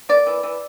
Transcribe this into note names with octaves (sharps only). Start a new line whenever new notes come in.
A#3 D5
E3
E3